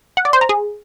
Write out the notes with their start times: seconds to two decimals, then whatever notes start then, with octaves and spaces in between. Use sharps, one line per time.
0.17 F#5
0.25 D5
0.33 C5
0.41 A#5
0.49 G#4